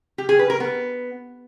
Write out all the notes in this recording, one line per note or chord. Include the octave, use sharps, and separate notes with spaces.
G4
G#4
B4
A#4
B3